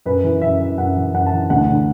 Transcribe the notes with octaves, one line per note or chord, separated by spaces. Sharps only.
F#2 B4
E3
F#2 E5
E3
F#2 F#5
E3
F#2 F#5
A5
E3
D2 F#5
D3